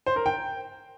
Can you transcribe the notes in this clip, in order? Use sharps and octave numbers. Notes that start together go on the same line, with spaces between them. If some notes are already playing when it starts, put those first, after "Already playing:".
C5
A#4
G5